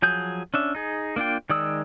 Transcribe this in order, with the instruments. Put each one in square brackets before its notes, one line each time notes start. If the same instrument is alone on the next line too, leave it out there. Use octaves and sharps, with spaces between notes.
[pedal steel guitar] F3 F#3 G#4 G6
C#4 D4 E5
D#4 G#4
A#3 D4 F4 G5
D#3 G#3 D5 D#6 E6